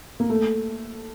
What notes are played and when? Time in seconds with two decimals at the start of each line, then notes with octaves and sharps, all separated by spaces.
0.20 A#3
0.30 A3